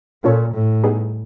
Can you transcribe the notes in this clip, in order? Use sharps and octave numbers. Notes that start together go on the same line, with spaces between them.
A#2 A#3 C#4 F4 A4 C#5
A2
G3 B3 D#4 G#4